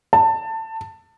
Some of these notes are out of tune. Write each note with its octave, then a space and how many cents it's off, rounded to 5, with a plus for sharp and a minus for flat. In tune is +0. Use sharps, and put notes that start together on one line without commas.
A5 +20